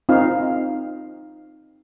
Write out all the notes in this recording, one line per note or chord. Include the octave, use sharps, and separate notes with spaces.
C4 D#4 F4 F5